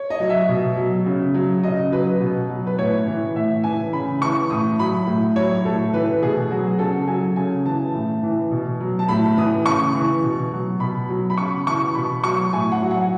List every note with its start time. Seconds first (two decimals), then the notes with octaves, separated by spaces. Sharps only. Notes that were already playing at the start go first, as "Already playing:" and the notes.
Already playing: C#5
0.10 D#5
0.20 F#3
0.30 E5
0.49 B2
0.77 F#3
1.06 C#3
1.34 F#3
1.63 C#3 D#5
1.92 F#3 B4
2.20 B2
2.49 F#3
2.67 B4
2.78 A2 C#5
3.07 E3
3.36 A2 E5
3.64 E3 G#5
3.93 C#3 B5
4.21 E3 C#6
4.50 A2 D#6
4.79 F#3 B5
5.07 A2
5.36 F#3 C#5
5.65 A2 A4
5.94 E3 B4
6.22 B2 G#4
6.51 F#3 F#4
6.79 C#3 A4
7.08 F#3 G#5
7.36 C#3 G#5
7.66 E3 A5
7.94 A2
8.23 E3
8.51 B2
8.80 F#3
8.99 A5
9.08 A2 B5
9.37 E3 D#6
9.66 C#3 C#6
9.94 E3
10.23 B2
10.53 F#3
10.80 B2 B5
11.10 F#3
11.30 B5
11.37 C#3 C#6
11.67 E3 C#6
11.95 B2 B5
12.24 F#3 C#6
12.53 A2 G#5
12.72 F#5
12.82 F#3
12.91 F#5